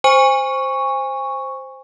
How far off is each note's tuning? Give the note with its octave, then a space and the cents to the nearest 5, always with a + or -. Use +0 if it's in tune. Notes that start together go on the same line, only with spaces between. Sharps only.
C5 +0 G#5 -30 C#6 +0